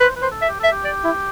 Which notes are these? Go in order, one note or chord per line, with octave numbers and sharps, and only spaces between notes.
B4 C5
B4
C5
A4
E5
G4
A4 E5
G4
D5
E4